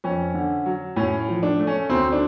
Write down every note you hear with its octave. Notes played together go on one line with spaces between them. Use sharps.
F2 C#4
D3
F#3
A2 C#4
F3
D4
A3
C#4
D2 C4
D4